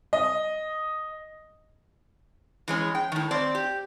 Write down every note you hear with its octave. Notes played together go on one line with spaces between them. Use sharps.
D#5
E3 G#3 C#4
G5
A2 D#3
C4 D5
G4